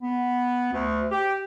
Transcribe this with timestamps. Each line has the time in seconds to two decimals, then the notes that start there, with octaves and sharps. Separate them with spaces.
0.01 B3
0.72 D2
1.12 G4